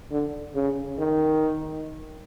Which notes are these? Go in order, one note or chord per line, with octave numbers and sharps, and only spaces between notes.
D3
C#3
D#3